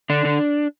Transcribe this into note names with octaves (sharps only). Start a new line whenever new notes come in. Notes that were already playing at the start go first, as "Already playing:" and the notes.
D3 D4
D3